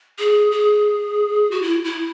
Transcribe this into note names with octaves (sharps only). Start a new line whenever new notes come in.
G#4
G#4
F#4
E4
E4